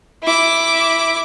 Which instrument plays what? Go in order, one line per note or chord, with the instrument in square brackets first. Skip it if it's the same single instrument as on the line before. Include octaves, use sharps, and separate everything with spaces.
[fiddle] E4 D6